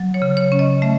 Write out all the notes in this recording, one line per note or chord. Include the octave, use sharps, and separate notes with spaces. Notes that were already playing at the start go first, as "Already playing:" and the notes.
Already playing: F#3
C#5
C#3
C#5
C#4
D#5
A3 E5